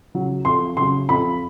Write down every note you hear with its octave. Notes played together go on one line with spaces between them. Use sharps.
C#3 F#3
F2 C6
C#3 F#3 C6
F2 B5